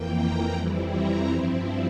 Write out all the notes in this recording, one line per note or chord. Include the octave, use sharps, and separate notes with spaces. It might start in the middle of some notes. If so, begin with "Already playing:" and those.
Already playing: F2 E3 A#3 G5
A#5
F2 E3 G3 C4 E4
A#5
G2 F3 C4 E4